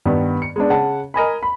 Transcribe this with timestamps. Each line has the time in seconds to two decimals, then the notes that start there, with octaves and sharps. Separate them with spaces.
0.05 G2 D#3 B3
0.42 C#7
0.56 G#3 B3 D4
0.69 C#3 F#5 A5
1.14 A#4 D#5 G#5 B5
1.43 B5